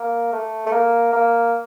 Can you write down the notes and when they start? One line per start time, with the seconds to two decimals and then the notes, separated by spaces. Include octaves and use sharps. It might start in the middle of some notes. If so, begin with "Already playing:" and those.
Already playing: A#3
0.33 A3
0.66 A3
0.72 A#3
1.13 A#3